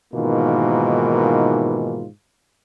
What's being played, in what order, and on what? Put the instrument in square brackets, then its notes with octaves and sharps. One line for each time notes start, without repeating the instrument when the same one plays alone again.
[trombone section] G#2 B2 D#3 E3 A#3 F4